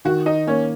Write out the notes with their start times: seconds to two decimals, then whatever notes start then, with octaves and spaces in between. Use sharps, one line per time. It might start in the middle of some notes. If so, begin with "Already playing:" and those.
0.05 D#3 F#4
0.26 D#4
0.47 A#3 C#4